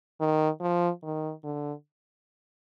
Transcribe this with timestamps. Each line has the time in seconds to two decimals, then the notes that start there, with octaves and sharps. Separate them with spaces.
0.21 D#3
0.61 F3
1.03 D#3
1.44 D3